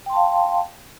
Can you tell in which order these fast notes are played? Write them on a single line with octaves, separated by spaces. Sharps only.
G5 C6 A5 F5